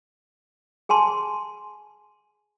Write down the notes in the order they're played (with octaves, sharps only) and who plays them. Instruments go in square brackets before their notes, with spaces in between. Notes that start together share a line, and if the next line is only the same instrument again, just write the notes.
[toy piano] G#4 G#5 A5 C6